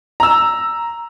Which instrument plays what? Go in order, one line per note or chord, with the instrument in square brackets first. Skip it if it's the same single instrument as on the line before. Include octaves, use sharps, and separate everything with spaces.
[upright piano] A#5 E6